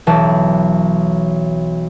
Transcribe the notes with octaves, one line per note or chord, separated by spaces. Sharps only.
B1 E3 A5